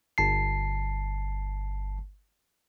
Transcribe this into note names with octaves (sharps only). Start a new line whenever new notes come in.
G1 A5 C7